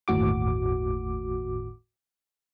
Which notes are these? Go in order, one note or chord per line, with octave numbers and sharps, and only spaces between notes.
G1 D#2 A2 F#4 D6